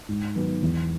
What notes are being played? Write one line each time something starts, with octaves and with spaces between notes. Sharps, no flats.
G#2
D#3 F#3 B3
E2